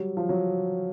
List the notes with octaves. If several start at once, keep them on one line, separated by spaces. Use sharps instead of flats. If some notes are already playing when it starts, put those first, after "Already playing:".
Already playing: F#3 G3
F3
F#3